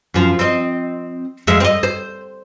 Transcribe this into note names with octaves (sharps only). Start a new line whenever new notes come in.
F#2 F3
C4 D#5
F2 G#3 E5
C4 D#5
C5